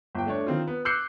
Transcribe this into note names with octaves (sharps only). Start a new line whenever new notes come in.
G1 G5
A3 D4 C#5
D#3 C4 F4
B3
D6 E6 F#6 G6 C7 C#7